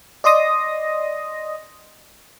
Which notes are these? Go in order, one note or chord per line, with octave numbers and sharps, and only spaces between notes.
D5 D#5 C6 D#6 A#6